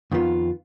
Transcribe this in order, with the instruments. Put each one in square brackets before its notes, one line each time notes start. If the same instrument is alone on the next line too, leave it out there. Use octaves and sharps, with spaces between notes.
[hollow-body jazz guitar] F2 D#3 B3 F4